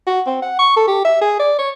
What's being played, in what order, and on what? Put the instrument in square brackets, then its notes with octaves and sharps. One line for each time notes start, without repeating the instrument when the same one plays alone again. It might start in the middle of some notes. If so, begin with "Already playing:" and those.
[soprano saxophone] F#4
C4
F#5
C#6
A4
G4
E5
G#4
D5
C#5